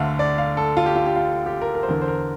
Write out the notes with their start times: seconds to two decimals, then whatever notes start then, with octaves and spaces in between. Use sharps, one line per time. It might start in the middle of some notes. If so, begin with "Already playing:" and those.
Already playing: D2 D3 E5 F5
0.19 D5
0.38 F5
0.57 A4
0.77 F4
0.86 G4
0.96 F4
1.06 G4
1.16 F4
1.46 G4
1.62 A#4
1.75 A#4
1.83 C5
1.89 E2 D3 A#4
2.02 C5
2.08 A#4